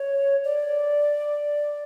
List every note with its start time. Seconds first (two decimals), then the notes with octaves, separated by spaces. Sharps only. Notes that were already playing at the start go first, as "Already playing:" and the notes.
Already playing: C#5
0.44 D5